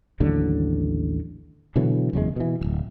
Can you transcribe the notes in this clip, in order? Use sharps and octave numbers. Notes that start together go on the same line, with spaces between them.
A1 D#2 D3 F#3
B2 D3 E3 F#3
F#1 E2 C3 G#3
B2 E3
D1 G#1